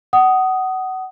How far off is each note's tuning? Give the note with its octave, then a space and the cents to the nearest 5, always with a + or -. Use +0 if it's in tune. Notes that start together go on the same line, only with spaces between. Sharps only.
F#5 +25 D#6 +0